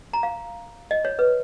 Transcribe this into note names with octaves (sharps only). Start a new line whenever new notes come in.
A#5
F5
D#5
C#5
B4